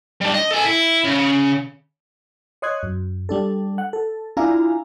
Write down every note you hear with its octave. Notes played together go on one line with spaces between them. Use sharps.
G3 D4
D#5
A4 G#5
E4
C#3
C#5 D#5 C6 D#6 F#6 G#6
F#2
G3 D4 A4
F#5
A4
D4 E4 F4 F5 G#5 A#5